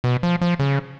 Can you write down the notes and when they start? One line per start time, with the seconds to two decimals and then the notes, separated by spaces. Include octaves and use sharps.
0.04 B2
0.23 F3
0.41 F3
0.59 C#3